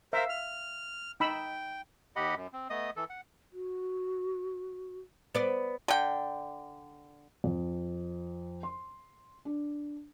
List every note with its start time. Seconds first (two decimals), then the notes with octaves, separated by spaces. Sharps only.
0.13 A#4 C5 E5 F5
0.29 F6
1.20 D#4 G5 B5 E6
2.16 D#2 G4 D#5 F#5 B5
2.36 F#2
2.53 C4
2.70 A3 B3 D#5 D#6
2.96 E3 A4
3.10 F#5
3.53 F#4
5.35 B3 D5
5.88 D3 G5
7.44 F2
8.63 C6
9.45 D4